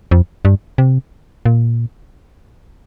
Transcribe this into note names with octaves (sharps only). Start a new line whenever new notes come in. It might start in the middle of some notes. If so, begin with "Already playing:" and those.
F2
G2
C3
A#2